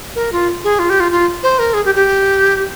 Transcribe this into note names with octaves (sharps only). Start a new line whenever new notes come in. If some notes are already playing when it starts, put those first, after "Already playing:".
A#4
F4
G#4
F4
G4
F4
F4
C5
A#4
G#4
G4
G4